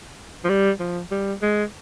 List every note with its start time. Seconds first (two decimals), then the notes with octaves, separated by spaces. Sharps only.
0.44 F3
0.49 G3
0.79 F3
1.11 G3
1.42 G#3